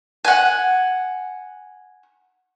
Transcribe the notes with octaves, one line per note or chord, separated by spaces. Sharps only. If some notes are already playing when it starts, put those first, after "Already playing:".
F#5 G#5